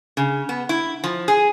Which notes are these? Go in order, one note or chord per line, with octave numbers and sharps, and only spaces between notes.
C#3
B3
E4
F3
G#4